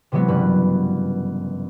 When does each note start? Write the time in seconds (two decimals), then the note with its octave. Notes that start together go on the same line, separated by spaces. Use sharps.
0.12 C3 E3 F#3 G#3 B3
0.28 F#1 G2 B4